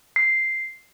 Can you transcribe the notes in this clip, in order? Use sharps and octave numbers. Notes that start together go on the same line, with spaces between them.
C7